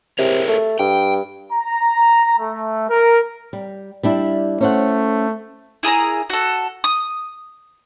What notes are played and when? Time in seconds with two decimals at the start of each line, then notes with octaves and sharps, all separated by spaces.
0.19 C3 G#4 A#4 C#5
0.48 A3
0.79 G2 G5
1.53 A#5
2.39 A3
2.89 A#4
3.53 G3
4.03 G3 D4 E4
4.61 A3 C#4 C5 F#5
5.83 E4 G#4 A#4 A#5
6.30 F#4 A4
6.84 D#6